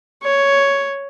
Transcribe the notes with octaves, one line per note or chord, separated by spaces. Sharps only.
C#5